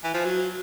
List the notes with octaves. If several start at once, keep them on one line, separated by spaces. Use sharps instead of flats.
E3
F3
F#3